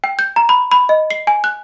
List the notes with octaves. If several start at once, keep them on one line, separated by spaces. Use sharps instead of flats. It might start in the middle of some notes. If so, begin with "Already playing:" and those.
G5
G6
A#5
B5
B5
D#5
C7
G#5
F#6